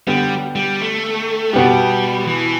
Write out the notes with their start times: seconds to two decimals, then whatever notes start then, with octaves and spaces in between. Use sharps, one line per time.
0.07 D3 G3 B3 G4
0.56 G3
0.81 A3
1.53 B2 G3 B3 G4
2.27 E3